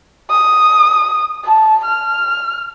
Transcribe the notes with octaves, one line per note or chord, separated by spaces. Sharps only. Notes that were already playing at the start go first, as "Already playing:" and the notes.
D#6
A5
F6